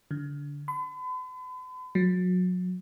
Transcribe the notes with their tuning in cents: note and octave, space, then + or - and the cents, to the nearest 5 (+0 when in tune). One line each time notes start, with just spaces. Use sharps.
D3 -30
B5 +45
F#3 -30